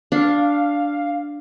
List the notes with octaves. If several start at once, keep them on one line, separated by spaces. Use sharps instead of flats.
D4 F5